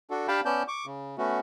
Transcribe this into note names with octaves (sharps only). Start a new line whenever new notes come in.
D4 F#4 A4
D4 G4 F5 G5 A5 B5
B3 C#4 D5 A5 G6
C#6 D6
C#3
A3 B3 C#4 F#4